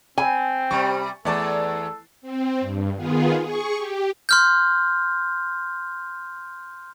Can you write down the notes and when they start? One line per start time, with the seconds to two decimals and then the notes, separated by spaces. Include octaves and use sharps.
0.18 C4 G#5 B5
0.71 C3 G3 C#6
1.25 E2 A3 A4 D5 A5
2.22 C4
2.60 G2
2.96 D#3 B3 F4 G#4
3.42 G#4 C#6
3.76 G4
4.29 C6 F6 G6